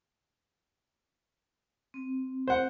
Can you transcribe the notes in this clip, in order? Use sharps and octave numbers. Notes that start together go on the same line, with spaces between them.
C4
C5 F#5